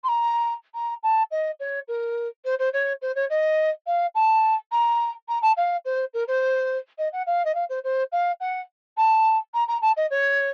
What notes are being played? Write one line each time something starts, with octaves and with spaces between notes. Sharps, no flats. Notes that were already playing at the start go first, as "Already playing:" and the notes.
C6
A#5
A#5
A5
D#5
C#5
A#4
C5
C5
C#5
C5
C#5
D#5
F5
A5
A#5
A#5
A5
F5
C5
A#4
C5
D#5
F#5
F5
D#5
F5
C5
C5
F5
F#5
A5
A#5
A#5
A5
D#5
C#5